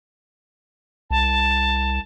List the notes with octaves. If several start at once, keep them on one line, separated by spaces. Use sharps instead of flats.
C2 A5